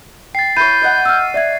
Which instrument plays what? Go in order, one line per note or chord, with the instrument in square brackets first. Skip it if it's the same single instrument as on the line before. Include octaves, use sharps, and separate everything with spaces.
[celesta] G5 [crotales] A6 C7
[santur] E4 C#5 [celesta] B5 [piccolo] G6 [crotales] C7 D#7
[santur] D#5 F#5
[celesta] E6 F6
D5 E5 G#6